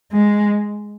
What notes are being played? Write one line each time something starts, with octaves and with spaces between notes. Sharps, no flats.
G#3